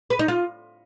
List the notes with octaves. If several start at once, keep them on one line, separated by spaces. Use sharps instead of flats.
B4
D#4
F4